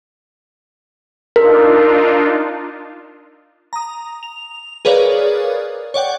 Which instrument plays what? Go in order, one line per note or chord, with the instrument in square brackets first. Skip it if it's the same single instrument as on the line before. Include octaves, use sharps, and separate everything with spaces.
[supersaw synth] D4 D#4 F4 [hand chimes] A#4
[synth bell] A#5 D#6
F7
G#4 A#4 B4 C#5 D5 F5
C#5 D5 F#5 G5